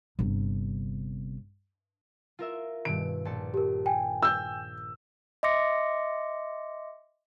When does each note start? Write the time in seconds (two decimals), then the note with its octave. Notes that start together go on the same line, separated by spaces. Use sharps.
0.19 G1 C3
2.39 F4 A#4 E5
2.85 G2 B2 D#3 D7
3.25 A#1 A5 C#7
3.54 G4 A#4
3.86 G5 G#5
4.23 E6 G6
5.43 D#5 E5 C6 D6 A#6 C#7